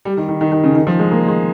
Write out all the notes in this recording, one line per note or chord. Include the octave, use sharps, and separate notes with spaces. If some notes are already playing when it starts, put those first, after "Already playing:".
G3
D#3
D#3
D#3
D#3
C#3
D#3
F3
G#3
A#3
G#3